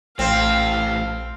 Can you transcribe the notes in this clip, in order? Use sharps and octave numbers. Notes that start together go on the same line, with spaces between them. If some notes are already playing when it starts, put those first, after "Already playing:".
A#1 A2 E3 C4 F5